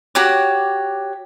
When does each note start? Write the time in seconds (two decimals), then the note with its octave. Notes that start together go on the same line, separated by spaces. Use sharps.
0.15 F#4 G4 C#5 D6